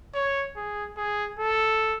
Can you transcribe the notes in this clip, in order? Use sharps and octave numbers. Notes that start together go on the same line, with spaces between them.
C#5
G#4
G#4
A4